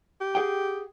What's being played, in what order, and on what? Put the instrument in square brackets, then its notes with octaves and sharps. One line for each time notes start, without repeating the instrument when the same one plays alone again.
[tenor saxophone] G4
[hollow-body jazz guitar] G#4 F#5 G5